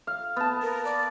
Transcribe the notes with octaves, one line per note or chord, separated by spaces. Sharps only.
F5
B3 A5
A#4
D5